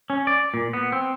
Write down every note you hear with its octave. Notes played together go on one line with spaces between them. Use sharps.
C#4
D5
A#2
B3
C4